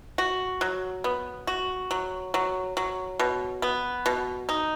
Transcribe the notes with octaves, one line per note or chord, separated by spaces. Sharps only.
F#4
F#3
B3
F#4
F#3
F#3
F#3
B2
B3
B2
D#4